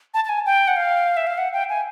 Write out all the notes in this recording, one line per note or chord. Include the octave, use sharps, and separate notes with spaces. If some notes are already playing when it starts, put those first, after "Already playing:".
A5
A5
G#5
G5
F#5
F5
E5
F5
F#5
G5
G#5